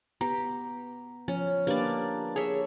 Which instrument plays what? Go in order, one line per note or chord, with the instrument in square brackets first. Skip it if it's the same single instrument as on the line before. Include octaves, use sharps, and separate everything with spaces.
[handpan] B3 [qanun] G4 [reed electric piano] A#5
[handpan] F3 [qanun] C#4
[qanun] A#3 D5 [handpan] D4 G4 B4
[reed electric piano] G#4 [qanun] C#5 E5